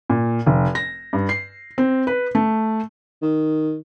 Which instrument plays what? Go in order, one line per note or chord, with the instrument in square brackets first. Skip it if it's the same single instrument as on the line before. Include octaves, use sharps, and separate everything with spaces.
[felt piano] A#2
F1
A#6
G2
C7
C4
B4
A3
[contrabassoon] D#3